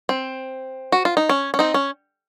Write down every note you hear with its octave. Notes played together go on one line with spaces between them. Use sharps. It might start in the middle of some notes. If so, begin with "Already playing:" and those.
C4
F#4
F4
D#4
C#4
C#4
C4 D#4
C#4